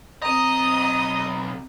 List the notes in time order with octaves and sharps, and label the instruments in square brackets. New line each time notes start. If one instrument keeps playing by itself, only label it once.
[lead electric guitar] B1 A#5 [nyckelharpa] C4 D#6 [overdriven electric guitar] D#5